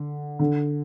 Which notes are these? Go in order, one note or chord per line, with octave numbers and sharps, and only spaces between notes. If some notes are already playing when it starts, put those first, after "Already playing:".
Already playing: D3
D3